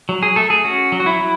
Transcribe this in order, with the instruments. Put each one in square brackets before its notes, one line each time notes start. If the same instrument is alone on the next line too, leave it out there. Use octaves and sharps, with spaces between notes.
[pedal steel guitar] F#3
G#4
A3 A4
G#4
C#4 F#4
F#3
F#4
E4
F#3